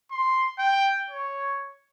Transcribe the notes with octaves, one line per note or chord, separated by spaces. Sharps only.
C6
G5
C#5